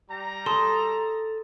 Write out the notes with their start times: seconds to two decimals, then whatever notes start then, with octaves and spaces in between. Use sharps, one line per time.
0.10 G3 A#5
0.46 A4 A5 C6 D#6